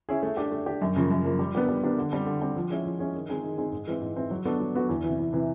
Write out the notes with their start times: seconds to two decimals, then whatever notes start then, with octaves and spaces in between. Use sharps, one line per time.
0.09 C#4 E4 G#4
0.23 A3
0.37 D4 G4
0.51 A3
0.66 D4 G4
0.82 F#2
0.96 C#3 F3 A#3
1.11 F#2
1.25 C#3 F3 A#3
1.39 G3
1.54 B3 D4 G4 A#4
1.69 G3
1.83 B3 D4 G4 A#4
1.98 D3
2.12 G3 C4
2.26 D3
2.41 G3 C4
2.56 F3
2.70 G#3 C#4 E4 G#4
2.86 F3
2.99 G#3 C#4 E4 G#4
3.14 D#3
3.29 G#3 C4 D#4 G#4
3.43 D#3
3.58 G#3 C4 D#4 G#4
3.72 G#2
3.87 E3 G#3 C4
4.01 G#2
4.16 E3 G#3 C4
4.31 F#3
4.45 B3 D4 F#4 A4
4.60 F#3
4.75 B3 D4 F#4 A4
4.89 E2
5.04 C3 E3
5.19 E2
5.33 C3 E3